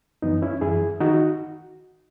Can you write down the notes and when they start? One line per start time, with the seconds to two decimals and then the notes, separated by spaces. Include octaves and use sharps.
0.22 F#2 E3 B3 D#4
0.42 C#4 E4
0.61 F#2 E3 E4 G#4
1.00 D#3 D#4 F#4